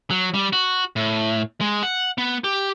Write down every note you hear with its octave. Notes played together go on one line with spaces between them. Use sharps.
F#3
G3
F#4
A2
G#3
F#5
B3
G4